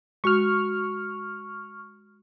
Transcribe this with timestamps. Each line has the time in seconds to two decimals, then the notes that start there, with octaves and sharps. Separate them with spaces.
0.24 G#3 F#4 C#6 F6